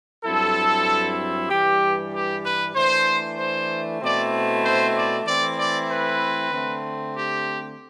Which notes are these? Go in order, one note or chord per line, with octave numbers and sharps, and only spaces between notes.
G2 F#3 C4 E4 A4
G2 E3 G3 G4
G4
B4
E3 A3 D4 C5
C5
B2 A3 C4 E4 D5
C5
D5
E3 A3 C4 E4 D5
D5
B4
D3 A3 C4
G4